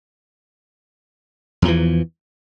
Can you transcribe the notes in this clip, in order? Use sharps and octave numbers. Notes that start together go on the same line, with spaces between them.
E2 E3 F3